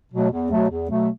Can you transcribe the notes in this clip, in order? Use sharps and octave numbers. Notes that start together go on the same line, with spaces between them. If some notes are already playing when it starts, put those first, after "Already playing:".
B2 F#3 A3
E2
B2 F#3 A3
E2
B2 F#3 A3